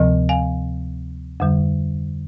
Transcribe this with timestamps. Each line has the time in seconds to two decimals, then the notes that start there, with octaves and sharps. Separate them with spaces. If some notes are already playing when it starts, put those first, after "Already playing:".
Already playing: D2 C3 F3
0.29 F5 G#5
1.40 F2 D3 G3